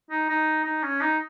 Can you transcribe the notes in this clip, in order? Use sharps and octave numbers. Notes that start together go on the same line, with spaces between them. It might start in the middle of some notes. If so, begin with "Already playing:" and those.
D#4
D#4
D#4
C#4
D#4